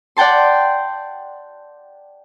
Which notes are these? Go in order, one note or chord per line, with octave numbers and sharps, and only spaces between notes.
D5 F#5 G5 A5 C6